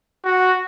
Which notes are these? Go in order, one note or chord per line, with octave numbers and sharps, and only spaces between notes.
F#4